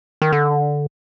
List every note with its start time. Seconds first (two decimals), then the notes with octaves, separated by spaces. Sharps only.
0.22 D#3
0.32 D3